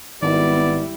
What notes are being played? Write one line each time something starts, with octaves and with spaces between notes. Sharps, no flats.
G#1 G3 B3 E4 D5